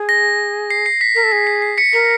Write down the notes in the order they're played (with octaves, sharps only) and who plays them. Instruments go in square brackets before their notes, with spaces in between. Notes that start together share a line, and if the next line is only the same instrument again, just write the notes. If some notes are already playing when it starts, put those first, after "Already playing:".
Already playing: [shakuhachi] G#4
[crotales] A#6
C7
C7
B6
[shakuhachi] A#4 [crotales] B6
[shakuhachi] A4
[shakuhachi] G#4 [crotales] B6
[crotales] C7
C7
B6 C#7
[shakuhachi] A#4 [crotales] B6 C#7